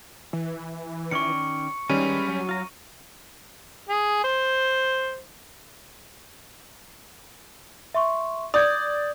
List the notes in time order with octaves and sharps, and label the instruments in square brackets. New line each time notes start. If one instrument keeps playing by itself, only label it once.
[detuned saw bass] E3
[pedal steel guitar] D#3 C#4 D5 [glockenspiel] C#6 C#7
[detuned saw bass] D#3 [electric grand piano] G3 C#4 [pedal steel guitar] G#3 B4 E5 [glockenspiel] D#7
[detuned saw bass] F#3
[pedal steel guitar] F4 A#5
[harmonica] G#4
C5
[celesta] E5 C6 C#6
[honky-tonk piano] D5 [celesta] D#6 G6 G#6